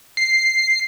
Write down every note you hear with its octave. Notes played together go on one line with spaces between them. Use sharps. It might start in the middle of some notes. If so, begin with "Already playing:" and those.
C7